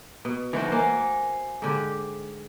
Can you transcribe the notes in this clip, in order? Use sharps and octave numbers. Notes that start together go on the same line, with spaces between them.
B2
E3 G3 A#3 D#4 F#4 C5
A#3 C5 G#5
G#2 D3 G4